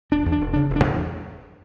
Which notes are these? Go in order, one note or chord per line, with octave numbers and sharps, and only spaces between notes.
E1 D4
E2
D4
E1
C#3 D4
E1
D4
E2